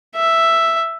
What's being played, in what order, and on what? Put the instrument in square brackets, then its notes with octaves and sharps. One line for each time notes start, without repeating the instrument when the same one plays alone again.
[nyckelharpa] E5